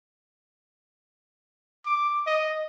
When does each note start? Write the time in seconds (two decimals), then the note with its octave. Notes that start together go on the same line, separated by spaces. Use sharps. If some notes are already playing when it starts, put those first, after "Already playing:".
1.86 D6
2.26 D#5